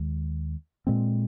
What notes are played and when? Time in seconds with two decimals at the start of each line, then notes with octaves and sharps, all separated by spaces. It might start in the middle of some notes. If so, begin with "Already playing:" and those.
Already playing: D#2 D#3 G#3
0.87 A#2 G#3 C4